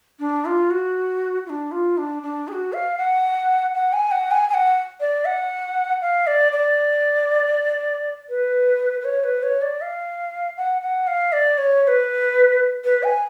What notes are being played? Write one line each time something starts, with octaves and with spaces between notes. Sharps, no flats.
D4
F4
F#4
F4
D4
F4
D4
D4
G#4
F#4
F5
F#5
F#5
G#5
F#5
G#5
G#5
F#5
D5
F#5
F5
D5
D5
B4
B4
C#5
B4
C#5
D5
F5
F#5
F#5
F5
D5
C#5
C#5
B4
B4
G#5